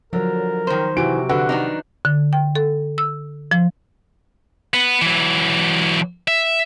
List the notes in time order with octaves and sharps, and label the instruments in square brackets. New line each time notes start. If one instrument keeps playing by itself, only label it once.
[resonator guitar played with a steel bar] D3 [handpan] F3 F#3 [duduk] A#4
[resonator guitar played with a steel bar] D#3 C5
[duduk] C3 [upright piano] E3 D7 [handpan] F#4
[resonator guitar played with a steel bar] D3 [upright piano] F#4 [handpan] B4
[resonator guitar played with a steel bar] D#3 D4 D#4
[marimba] D3
G5
A4
E6
F3
[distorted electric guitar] B3
E3 F#3
E5